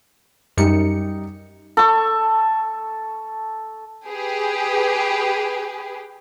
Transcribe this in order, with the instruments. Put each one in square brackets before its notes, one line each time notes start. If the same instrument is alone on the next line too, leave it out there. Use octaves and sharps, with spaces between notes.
[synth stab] F#2 C#7 [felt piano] G3 D#4
[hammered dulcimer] A4 C#6
[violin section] G4 G#4 B4